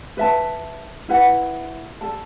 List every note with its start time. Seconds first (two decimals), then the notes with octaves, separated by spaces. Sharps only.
0.17 B4 E5 A5
1.08 E4 B4 F#5
2.01 A4 D5 A5